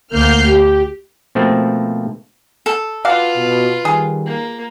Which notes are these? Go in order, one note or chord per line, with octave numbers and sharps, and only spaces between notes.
D2 A#3 F6 G6 C7
G4
B2 F3 A3 A#3 C4
A4
F4 F#4 B4 D5 F5
B2
D#3 G3 G#4
A#3